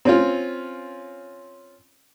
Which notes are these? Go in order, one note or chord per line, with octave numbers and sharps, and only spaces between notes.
C4 C#4 F4